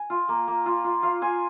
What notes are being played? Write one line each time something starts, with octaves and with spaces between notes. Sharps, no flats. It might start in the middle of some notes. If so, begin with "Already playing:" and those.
Already playing: G#5
F4
A#3
A#3
F4
F4
F4 F5
F4 G#5